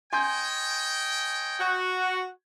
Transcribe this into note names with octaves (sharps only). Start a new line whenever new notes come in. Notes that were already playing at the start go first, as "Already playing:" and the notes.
C#5 D#5 G5 G#5 C6 G6
F#4